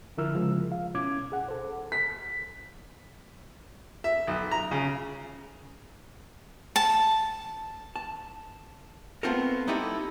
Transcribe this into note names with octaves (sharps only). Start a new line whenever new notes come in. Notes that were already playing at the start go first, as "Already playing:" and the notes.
D3 F3 E4 A#4 E6 F6
C#3 F3 G#3
F5
B2 C#4 E4 D6 G#6
G#4 F#5
A4 C5
B6
E5
B1
A#5
C#3
A5
A5
A3 B3 C4 F4 A4 A#4
G3 D#4 E4 G4 A4 D#5